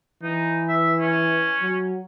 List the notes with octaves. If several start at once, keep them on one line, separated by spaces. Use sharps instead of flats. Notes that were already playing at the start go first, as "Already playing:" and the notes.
E3 D#4
E5
C#4
F#3